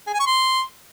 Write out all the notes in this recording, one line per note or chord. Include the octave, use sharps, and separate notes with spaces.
G#4
G#5
C#6
C6